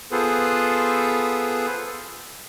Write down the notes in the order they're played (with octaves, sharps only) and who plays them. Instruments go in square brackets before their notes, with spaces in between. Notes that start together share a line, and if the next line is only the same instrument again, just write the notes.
[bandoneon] B3 F4 G#4 A4 B4 C5